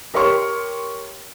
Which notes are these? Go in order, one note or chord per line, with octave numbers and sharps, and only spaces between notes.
G4 A#4 C#5 C6 C#6 F6